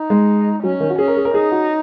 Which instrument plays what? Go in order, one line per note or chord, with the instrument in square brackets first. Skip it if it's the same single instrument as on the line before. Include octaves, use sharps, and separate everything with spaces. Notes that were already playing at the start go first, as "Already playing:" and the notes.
Already playing: [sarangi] D#4
[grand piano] G#3
[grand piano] F#3 [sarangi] C#4
[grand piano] D#3
F#4
[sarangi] C#4 [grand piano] G#4
[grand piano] A#4
G#4
A#4
[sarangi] D#4 [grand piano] G#4
[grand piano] F#4